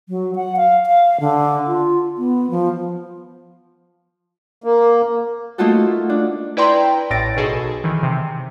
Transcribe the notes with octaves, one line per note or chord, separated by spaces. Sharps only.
F#3
F#5
F5
F5
D3
F4
B3
F3
A#3
A3 A#3 D#4 F4 F#4 A4
D4
E4 B4 D5 G5 A#5 C6
A1 A2 A6 A#6 D7
B1 B2 G#4 A4
D#3 E3
C3